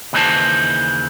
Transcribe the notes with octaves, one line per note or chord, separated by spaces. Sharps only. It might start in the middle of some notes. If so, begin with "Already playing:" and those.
D#2 C#3 E3 D#4 C5 A5